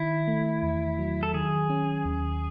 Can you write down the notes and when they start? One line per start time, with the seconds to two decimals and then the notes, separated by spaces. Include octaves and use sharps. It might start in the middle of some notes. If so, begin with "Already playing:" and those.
Already playing: D#3 E4
0.27 A3
0.63 E2
0.99 F#3
1.23 A4
1.34 D#3 G#4
1.70 C#4
2.05 D#2